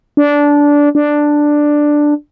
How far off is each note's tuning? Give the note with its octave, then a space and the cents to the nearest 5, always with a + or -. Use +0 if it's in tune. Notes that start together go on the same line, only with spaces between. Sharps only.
D4 -15
D4 +5